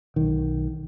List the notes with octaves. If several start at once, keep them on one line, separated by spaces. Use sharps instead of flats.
B1 D#3